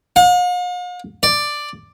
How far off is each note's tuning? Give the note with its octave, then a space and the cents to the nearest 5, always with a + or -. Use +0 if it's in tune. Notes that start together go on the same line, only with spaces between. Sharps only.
F5 +45
D5 +5